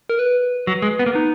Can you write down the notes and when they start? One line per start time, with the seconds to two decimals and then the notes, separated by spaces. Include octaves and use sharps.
0.09 A#4
0.19 B4
0.67 F#3
0.82 G#3
0.99 B3
1.06 A#3
1.13 B3 D#4